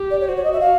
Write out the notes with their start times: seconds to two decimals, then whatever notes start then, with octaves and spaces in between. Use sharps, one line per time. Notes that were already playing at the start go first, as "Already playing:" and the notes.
Already playing: G4
0.10 D5
0.20 C#5
0.27 F#4 C5
0.36 C#5
0.43 D#5
0.52 E5
0.60 F5